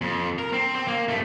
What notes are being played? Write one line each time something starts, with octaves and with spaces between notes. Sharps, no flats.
F2
A#4
C4
C4
A#3
G2 A3